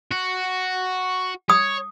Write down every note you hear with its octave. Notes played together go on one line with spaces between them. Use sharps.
F#4
C#5 D#6